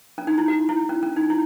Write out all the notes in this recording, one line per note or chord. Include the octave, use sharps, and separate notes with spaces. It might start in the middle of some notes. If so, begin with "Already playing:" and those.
C#4
D#4
E4
F#4
E4
C#4
C#4
D#4
E4